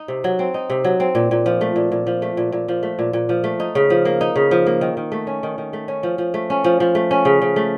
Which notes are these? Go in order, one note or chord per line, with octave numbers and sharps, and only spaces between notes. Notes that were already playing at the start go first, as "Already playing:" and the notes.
Already playing: D#4
C3
F#3
C4
D#4
C3
F#3
C4
A#2
A#2
F3
A3
A#2
A#2
F3
A3
A#2
A#2
F3
A3
A#2
A#2
F3
A3
D#4
C#3
F3
A#3
D#4
C#3
F3
A#3
D#3
D#3
A3
C#4
D#3
D#3
A3
C#4
F3
F3
A3
C#4
F3
F3
A3
C#4
C#3
C#3
A3